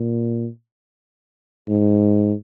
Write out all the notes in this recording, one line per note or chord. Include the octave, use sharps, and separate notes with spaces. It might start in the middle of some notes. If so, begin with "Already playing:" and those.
Already playing: A#2
G#2